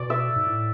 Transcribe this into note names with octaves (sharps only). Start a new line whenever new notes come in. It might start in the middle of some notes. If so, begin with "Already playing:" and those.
Already playing: B2 D5
E5
G#2
A2